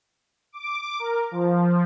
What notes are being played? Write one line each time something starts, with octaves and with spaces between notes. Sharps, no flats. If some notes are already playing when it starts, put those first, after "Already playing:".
D6
A#4
F3